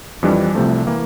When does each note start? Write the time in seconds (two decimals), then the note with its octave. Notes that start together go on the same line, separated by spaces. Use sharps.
0.23 F2 E3 G3 D4
0.55 C2 C3 F3 A3
0.87 E3 A#3